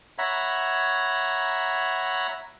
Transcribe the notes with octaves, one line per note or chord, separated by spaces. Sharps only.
C#5 E5 F#5 A#5 B5